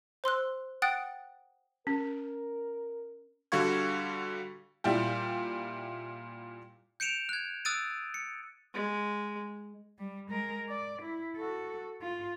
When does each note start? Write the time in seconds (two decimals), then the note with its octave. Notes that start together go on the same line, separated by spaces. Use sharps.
0.24 C5 C6 E6 F#6
0.82 F#5 G5 D#6 F#6 A6 D7
1.87 C#4 A#4
3.52 D3 G3 F#4 F5 C#6 G#6
4.84 A#2 G3 E4 G4
7.00 G6 C#7 D7 E7 F7
7.29 F#6 G#6
7.65 D#6 E6 F#6 A6 D7 D#7
8.14 C#7
8.74 G#3
9.99 G3
10.30 G#3 A#4
10.69 D5
11.02 E4
11.37 F#4 A4
12.01 F4